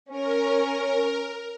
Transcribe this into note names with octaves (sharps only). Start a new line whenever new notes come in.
C#4 A#4